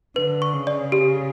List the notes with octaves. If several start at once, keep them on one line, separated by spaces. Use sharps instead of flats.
D3 B4
C#6
C#3
D5
G4